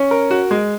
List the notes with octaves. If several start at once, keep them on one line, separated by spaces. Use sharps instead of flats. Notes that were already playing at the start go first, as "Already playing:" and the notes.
Already playing: C#4
A#4
F#4
G#3